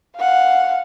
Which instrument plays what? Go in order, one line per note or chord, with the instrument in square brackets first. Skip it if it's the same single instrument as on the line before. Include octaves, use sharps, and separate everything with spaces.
[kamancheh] F5 F#5